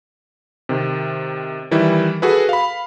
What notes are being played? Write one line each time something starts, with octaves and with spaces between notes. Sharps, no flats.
C3 D#3
D#3 E3 G3 E4
F#4 G#4 A4 B4
F5 B5